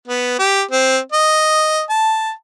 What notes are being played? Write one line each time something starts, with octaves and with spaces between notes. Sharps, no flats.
B3
G4
C4
D#5
A5